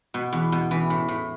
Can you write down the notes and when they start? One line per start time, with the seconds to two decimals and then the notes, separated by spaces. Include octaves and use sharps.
0.14 B2
0.33 E2
0.52 B2
0.71 E3
0.90 A2
1.08 A2